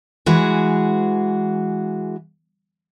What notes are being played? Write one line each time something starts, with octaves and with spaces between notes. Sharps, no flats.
E3 G#3 F#4 G#4